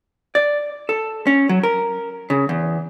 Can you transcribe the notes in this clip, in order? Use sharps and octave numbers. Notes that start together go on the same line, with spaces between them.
D5
A4
C#4
F#3
A#4
C#3
E2